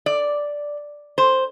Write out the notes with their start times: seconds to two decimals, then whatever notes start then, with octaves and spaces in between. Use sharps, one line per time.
0.06 D5
1.18 C5